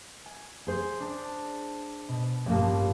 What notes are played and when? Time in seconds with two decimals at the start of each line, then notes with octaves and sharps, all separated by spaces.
0.26 G#5
0.67 G#4 C5
1.00 D4 A5
2.08 B2
2.46 A1 G2 A#2 F3 A#3